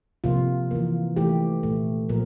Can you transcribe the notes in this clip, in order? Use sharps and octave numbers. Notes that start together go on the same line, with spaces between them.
C3 F3 A#3 F4
E3 A#3
E3 A3 G4
A#2 A3
A#2 F3 A3 A#4